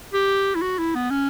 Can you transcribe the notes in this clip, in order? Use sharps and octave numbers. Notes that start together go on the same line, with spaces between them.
G4
E4
F#4
E4
B3
C#4